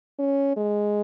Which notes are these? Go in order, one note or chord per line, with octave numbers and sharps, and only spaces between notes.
C#4
G#3